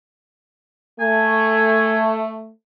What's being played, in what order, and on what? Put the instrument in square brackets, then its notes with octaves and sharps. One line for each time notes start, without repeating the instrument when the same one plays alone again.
[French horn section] A3 [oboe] G#5